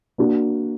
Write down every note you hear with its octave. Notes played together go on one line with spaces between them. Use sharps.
A#3 D4 F#4